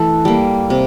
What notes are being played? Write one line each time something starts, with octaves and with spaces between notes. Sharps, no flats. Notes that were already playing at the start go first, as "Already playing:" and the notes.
Already playing: E3 A3 A4
G3 A#3
C3